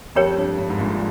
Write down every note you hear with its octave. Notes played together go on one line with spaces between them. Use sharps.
F2 G4 A#4 C#5 G5
G2
G2
G#2
A#1 A#2